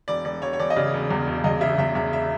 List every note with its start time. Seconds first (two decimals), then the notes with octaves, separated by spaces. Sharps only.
0.08 E1 D5
0.25 E1 D5
0.42 E1 C#5
0.53 C#5
0.59 E1 D5
0.70 D#5
0.76 C#3 D5
0.93 E1
1.10 E2
1.27 E1
1.44 E2 D#5
1.61 C#3 E5
1.78 E2 E5
1.95 E2 E5
2.13 E5